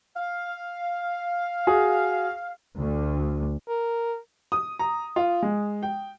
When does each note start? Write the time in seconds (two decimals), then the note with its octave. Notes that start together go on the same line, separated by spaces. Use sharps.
0.16 F5
1.67 F#4 G#4
2.79 D2
3.68 A#4
4.52 D#6
4.79 A#5
5.16 F4
5.42 G#3
5.83 G5